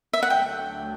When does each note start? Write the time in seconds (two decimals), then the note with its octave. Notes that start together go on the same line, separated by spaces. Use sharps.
0.13 E5
0.23 F#5
0.30 D2 D3 F#3 A3 G5